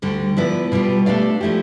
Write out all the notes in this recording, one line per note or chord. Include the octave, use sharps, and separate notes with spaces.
D2 D3 G3
F3 B3 E4 B4 D5
B2 G3 B3 F4
A3 D4 G4 D5 F5
F3 A3 E4 G4